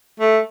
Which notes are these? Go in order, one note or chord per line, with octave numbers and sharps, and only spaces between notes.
A3